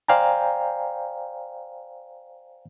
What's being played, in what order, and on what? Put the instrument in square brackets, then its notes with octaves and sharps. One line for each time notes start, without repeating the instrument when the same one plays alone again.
[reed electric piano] C5 D5 F5 G5 G#5 A#5